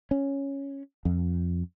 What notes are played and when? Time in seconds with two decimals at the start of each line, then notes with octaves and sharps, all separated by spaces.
0.11 C#4
1.05 F2